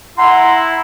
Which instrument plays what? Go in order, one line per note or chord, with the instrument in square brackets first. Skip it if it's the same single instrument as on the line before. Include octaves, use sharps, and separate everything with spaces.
[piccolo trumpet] E4 [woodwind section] F#5 A#5 C6